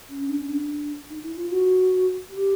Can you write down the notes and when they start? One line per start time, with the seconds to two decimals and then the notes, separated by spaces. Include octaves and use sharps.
0.09 C#4
0.29 D4
0.39 C#4
0.49 D4
1.10 D#4
1.23 E4
1.36 F4
1.50 F#4
2.30 G4